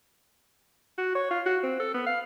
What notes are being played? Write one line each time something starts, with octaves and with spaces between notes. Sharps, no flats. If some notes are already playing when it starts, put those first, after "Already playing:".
F#4
C#5
F4
F#4
C4
A4
B3
F5